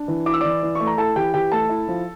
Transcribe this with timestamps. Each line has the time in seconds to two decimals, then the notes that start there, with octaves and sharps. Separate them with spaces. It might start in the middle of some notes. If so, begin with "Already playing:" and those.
Already playing: D4
0.08 E3
0.26 E4 D6
0.34 E6
0.41 E3 D5 D6
0.63 E3
0.75 A3 C#6
0.87 A#5
0.98 E4 A4 A5
1.16 E3 G4 G5
1.34 E3 G4 G5
1.52 A3 A4 A5
1.69 E4
1.88 F3